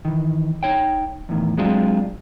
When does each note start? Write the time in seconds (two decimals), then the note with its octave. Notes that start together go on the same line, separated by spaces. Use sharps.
0.05 D#3 E3
0.63 D#4 C#5 G5
1.29 E2 A2 D#3
1.57 F#3 G#3 C4 D4 F4